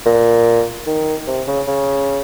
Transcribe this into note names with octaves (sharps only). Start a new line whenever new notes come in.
A#2
D#3
C3
C#3
C#3